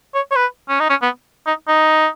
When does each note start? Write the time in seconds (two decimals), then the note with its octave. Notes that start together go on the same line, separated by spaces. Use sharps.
0.14 C#5
0.31 C#5
0.36 B4
0.69 C#4
0.80 D#4
0.90 C#4
1.02 B3
1.46 D#4
1.68 D#4